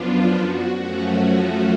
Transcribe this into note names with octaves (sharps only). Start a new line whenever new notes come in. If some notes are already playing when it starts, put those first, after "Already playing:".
Already playing: F#2 F3 B3 D4 F4
F#4
F#2 F3 A3 C#4 F#4
F#4